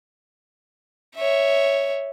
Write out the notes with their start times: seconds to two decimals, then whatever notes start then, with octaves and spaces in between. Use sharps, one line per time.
1.16 C#5 E5